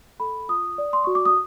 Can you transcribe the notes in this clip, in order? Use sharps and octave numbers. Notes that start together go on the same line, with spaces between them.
A4 B5
F4 D#6
D5
C6
F#4 C#6
D6
D#6